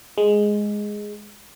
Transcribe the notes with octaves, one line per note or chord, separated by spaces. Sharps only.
G#3